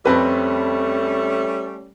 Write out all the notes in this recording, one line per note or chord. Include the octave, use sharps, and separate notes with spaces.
F2 G3 A3 C4 C#4 B4